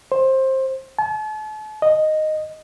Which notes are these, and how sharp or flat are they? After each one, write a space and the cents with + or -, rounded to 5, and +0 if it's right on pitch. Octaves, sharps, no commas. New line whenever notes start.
C5 +20
A5 -40
D#5 -5